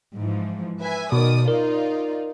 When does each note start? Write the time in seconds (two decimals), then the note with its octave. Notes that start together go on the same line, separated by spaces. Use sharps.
0.15 G#2 E3 F3
0.80 B4 E5 G#5
1.12 B2 D#3 D5 D#6
1.48 D#4 F4 A#4 D5